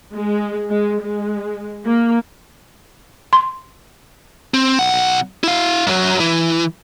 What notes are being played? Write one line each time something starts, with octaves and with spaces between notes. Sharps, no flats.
G#3
G#3
G#3
A#3
C6
C4
B1 F#5
E4 F5
F#2 F#3
E3